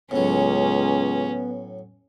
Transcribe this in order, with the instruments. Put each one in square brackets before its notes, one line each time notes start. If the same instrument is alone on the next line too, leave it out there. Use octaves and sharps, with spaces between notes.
[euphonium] C#2 [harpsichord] A2 F#3 [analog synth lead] B3 [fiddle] C#4